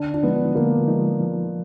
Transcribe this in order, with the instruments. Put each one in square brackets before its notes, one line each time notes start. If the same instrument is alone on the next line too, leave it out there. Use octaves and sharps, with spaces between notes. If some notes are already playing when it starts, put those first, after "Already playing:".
Already playing: [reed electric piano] D3 [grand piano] D4
[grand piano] D4
[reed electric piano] F3 G#3 D#4 [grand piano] B3
[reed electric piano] D3 [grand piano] A#3
[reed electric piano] F3 G#3 D#4
F3